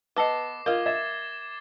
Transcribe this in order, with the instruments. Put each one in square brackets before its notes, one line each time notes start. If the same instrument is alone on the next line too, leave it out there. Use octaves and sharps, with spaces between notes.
[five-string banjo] B3 A4 [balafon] B4 D#5 [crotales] D6 A#6 C7
[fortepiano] F4 [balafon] A#4 [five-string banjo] D#5 F5 [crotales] G#6 G7
[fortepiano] E5 [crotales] G#6 A6 E7